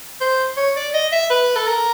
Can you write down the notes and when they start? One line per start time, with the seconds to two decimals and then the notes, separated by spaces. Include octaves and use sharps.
0.21 C5
0.57 C#5
0.76 D5
0.94 D#5
1.12 E5
1.31 B4
1.56 A4
1.67 A#4